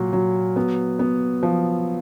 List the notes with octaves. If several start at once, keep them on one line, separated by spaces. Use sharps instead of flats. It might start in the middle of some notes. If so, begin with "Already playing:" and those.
Already playing: A#2 F#3
F#3
B3
B3
F3